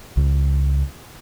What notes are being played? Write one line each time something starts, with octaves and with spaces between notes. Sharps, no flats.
C#2